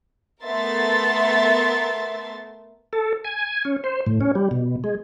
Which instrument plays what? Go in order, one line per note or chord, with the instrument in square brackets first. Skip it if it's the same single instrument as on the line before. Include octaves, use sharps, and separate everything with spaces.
[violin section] A3 B3 A#4 E5 C6 A6
[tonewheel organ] A4
G#5
C#4
C5
A2
C#4
G3
B2
G#3